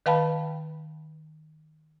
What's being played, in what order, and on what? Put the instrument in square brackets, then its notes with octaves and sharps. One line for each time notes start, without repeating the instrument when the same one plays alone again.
[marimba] D#3 B4 F5 G5 A5 B5